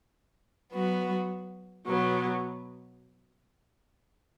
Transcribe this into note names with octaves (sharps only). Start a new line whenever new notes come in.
F#3 B3 F#4
B2 F#3 B3